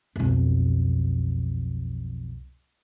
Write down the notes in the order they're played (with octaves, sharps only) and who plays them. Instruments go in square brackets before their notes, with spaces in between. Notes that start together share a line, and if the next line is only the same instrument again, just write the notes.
[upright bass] B1 F2